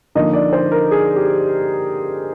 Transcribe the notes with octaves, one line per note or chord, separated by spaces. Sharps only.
D3 F3 A#3 D#4 D#5
D5
C5
A#4
G#4
G4